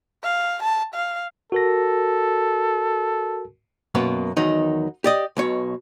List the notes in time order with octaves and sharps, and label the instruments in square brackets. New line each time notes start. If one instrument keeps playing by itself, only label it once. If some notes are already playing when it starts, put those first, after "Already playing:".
[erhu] F5
A5
F5
[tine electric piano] F#4 A#4 A#6 [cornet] A4
[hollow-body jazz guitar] F#2 B2 A#3 B3
E2 D#3 F#3 D#4
G4 D5 D#5
B1 B2 C#5